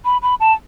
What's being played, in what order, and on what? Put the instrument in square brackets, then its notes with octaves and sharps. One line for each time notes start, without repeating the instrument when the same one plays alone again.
[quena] B5
B5
A5